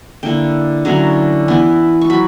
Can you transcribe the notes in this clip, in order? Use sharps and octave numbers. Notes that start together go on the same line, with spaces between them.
D3 A#3 E4 G5
D3 F#3 C#4 E4 A#5
E3 B3 E4
C#6
F#3 B5